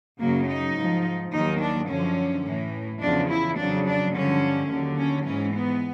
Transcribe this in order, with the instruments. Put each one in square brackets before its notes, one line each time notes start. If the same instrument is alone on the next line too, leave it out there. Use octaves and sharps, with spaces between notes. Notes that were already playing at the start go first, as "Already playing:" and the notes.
[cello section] F#2 C#3 F#3 A#3
D#4
G#2 F3
D#2 D#3 F#3 D#4
D4
F#2 D3 F3 C#4
A2 E3
E2 C#3 F3 D4
E4
F2 C#3 F#3 D4
D4
G2 D3 F3 C#4
D#2 D3 F#3
C#4
G#2 E3 C#4
B3